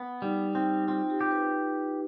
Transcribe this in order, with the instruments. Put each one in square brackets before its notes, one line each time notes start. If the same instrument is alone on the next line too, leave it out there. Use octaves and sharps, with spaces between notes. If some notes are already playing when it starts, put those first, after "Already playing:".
Already playing: [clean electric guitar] B3
[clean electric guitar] G3 [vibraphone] D#4
[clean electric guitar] C4 [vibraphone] D#4
[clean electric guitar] C4 [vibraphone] F4
[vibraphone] G4
[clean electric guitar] G4
[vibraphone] B4